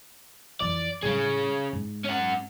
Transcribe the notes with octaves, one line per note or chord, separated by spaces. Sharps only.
F2 E3 D5
A2 G3 C#4 G#4
G#2
C#4 F#5